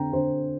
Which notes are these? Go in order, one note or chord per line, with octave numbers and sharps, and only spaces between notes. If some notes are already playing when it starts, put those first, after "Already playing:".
Already playing: D3 C4 G5 A#5
D3 C5